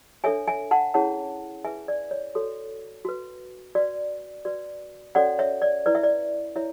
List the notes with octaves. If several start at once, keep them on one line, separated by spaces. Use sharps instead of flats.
D4 A4 C#5 E5 G#5
E5 G#5
F#5 A5
C#4 E4 G#4 C#5 F#5 A5
E4 G#4 B4 E5 G#5
D5
C#5
F#4 A4 C#5
F#4 B4
F#4 B4 D5
F#4 B4 D5
C#4 F#4 A4 C#5 D5 F#5
C#5 E5
D5
E4 B4 D5
E5
D5
E4 C#5 E5